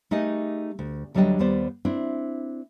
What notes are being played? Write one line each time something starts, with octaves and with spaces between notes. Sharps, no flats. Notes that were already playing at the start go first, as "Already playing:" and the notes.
A3 D#4 G4 G#4 A#4 D#5
D2
D2 F#3 G3 D4 D#5 G5
D#2 G3 B3 C5 D5
C4 D4 E4